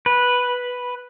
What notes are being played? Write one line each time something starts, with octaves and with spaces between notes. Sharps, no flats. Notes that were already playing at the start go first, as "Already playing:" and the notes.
B4